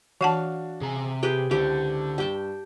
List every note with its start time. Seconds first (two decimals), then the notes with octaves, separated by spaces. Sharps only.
0.21 E3 D4 F#4 F5 F#5 A5
0.81 C3 G#4 G#5 A#5
1.23 G4 G#4 B4 G5
1.51 C#2 D3 E4 G4 C5
2.18 G2 G4 G5 A5